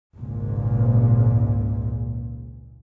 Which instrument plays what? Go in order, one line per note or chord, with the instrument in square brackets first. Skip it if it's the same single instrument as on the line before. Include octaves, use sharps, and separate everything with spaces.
[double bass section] G#1 C#2 A#2